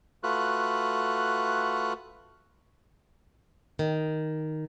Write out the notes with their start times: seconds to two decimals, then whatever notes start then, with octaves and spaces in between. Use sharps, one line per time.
0.23 A3 F4 F#4 B4 F#6
3.79 D#3